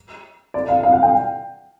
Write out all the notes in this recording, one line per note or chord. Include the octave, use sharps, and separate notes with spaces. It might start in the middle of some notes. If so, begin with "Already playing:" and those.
D5
F5
F5
F#5
G5